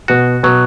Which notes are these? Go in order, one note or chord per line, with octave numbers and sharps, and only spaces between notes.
B2 F#4
B2 F#3